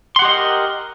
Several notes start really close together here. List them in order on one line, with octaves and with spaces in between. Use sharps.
C6 F#5 G4 D#5 A#4